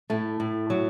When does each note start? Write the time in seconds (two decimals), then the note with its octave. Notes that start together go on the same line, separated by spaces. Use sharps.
0.10 A2 A3
0.40 A2
0.70 F#3